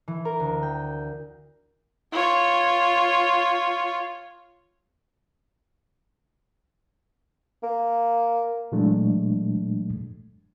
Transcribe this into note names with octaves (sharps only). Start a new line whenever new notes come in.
E3
A#4
D2
G5
F4 C#5
A#3
A#2 E3 F#3 G#3 A3 D4